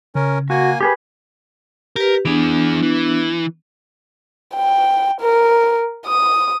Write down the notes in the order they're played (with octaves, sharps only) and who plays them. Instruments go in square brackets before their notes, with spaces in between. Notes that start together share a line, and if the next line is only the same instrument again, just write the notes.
[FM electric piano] C#3 [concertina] C#4 A#4
[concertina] A#3 G#5 [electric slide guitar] F#4
[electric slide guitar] G4 G#4 B4 [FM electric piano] A#4
[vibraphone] G4 B4 [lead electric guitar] A#4
[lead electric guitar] E3 G#4 [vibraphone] B3 D4
[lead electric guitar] E3
[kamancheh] G5
A#4
D#6